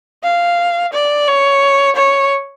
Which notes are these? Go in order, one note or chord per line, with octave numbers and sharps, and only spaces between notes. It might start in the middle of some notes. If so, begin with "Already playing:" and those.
F5
D5
C#5
C#5